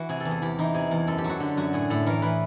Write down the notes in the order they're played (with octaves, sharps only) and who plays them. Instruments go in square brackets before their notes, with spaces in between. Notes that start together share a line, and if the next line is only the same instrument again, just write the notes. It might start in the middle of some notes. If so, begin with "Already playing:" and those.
Already playing: [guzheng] E3 F#4
C3 G#4
E2 A4
G#4
E2 G4
E3 D#4
C3 G#4
E2
F#2 A4
G4
F#3
F#4
D3 G4
F#2 F#4
A2 G#4
A2 A4
E3 A#4
E3 B4